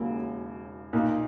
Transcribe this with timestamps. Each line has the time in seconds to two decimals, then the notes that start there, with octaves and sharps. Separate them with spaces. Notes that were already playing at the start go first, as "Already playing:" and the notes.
Already playing: E1 D#2 C#3 F#3 A#3
0.93 B1 A#2 A#3 D#4